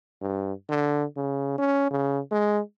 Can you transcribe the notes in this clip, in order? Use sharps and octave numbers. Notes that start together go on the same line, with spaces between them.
G2
D3
C#3
C#4
C#3
G#3